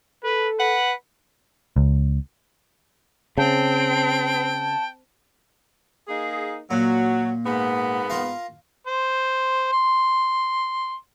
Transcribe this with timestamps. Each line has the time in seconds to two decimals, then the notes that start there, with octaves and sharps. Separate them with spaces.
0.24 A4 B4
0.59 B4 F#5
1.76 C#2
3.38 C#3 C4 G5 A5
6.08 A#3 D#4 G#4
6.71 A#2 F#3
7.46 G#2 A#3 B3
8.10 F4 A#4 F5
8.87 C5
9.72 C6